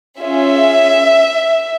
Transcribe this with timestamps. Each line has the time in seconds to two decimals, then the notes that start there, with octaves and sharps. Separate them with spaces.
0.20 C#4 F4 G#4 E5